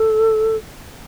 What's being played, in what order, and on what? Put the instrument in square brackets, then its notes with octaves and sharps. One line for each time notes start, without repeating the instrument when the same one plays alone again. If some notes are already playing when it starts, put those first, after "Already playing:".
Already playing: [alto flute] A4